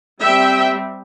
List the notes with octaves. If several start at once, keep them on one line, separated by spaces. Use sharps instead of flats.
G3 C4 E5 G5